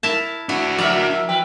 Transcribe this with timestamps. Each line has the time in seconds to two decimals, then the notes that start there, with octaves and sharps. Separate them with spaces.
0.03 E4 A#4 A5
0.49 D4 E4 F#4
0.78 F3 A#4 D5 E5 E6
1.29 F3 B4 G5